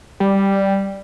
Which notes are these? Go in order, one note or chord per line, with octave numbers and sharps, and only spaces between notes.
G3